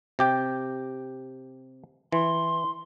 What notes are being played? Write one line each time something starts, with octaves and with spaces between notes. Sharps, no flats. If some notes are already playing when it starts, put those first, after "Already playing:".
C3 G4 G5
E3 C6